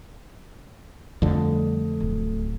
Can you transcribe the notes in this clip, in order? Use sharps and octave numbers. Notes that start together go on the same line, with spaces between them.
F2 D3 G3 A3 A4
D1 C#2